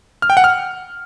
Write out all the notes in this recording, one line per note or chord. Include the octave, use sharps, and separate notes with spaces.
F6
G5
F#5
F6